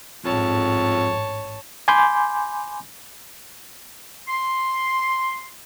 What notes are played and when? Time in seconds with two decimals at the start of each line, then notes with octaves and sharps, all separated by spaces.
0.24 A1 F2 G#2 C#5 A5
1.88 G#5 B5 C6 D6 G6
4.28 C6